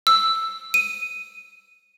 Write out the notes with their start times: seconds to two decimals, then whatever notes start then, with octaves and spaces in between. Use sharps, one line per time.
0.07 E6
0.74 D#7